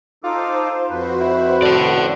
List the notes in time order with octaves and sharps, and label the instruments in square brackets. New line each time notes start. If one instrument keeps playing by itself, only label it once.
[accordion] D#4 A4 D6 [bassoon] F4 [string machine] C5
[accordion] F2 B4 [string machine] F#4 C5
[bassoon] E4
[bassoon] A2 [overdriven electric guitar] D5 F#5